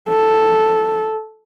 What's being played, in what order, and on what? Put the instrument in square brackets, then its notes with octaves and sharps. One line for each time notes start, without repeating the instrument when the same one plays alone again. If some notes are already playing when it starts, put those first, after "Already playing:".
[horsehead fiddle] A4